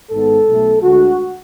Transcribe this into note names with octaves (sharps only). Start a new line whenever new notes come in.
G#1 G#2 G#3 B3 A4
B1 B2 A3
D2 D3 G#3 F#4